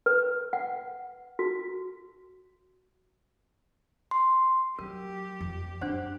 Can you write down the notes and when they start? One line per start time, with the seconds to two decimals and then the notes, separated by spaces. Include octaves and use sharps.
0.06 B4
0.53 F#5
1.39 F#4
4.11 C6
4.79 F#3 G4 A#4
5.41 F2
5.81 F#2 D4 C5 F#5